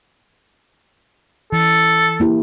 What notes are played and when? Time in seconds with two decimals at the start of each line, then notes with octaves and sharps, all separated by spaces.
1.53 E3 A4
2.20 A#3 E4 G4